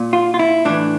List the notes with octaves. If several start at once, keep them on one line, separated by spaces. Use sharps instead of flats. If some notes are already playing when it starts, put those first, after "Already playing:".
Already playing: A#2
F4
F4
E4
A2 E3 D4